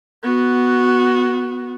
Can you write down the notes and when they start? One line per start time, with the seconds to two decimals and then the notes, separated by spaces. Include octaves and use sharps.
0.23 B3 F#4